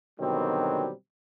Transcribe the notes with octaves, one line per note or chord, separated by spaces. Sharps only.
B2 D3 D#3 F#3 G3 C4